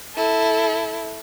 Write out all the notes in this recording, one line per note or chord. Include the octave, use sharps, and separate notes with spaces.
E4 A4